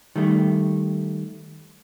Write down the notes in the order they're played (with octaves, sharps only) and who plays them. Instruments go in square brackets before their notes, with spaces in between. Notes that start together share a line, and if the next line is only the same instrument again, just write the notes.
[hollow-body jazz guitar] D#3 G3 A3